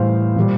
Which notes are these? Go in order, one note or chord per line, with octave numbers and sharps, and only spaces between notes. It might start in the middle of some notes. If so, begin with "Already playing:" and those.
Already playing: A2 E3 G3 C5 F5
A#2 G3